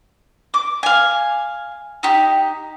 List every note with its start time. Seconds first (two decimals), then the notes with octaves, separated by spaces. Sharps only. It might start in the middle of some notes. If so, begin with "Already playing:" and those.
0.54 D6
0.83 F5 G#5
2.03 D#4 G4